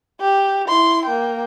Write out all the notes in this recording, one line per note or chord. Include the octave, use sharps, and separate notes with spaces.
G4
E4 C6
A#3 G5